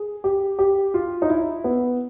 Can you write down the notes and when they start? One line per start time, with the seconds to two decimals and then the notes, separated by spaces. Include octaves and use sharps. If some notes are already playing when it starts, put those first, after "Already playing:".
Already playing: G#4
0.24 G4
0.59 G4
0.94 F4
1.22 D#4
1.30 E4
1.64 B3